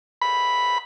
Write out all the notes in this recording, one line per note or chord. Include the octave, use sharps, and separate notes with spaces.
B5